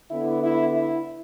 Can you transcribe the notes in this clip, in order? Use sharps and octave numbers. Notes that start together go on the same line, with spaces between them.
D3 B3 E4
E4
E4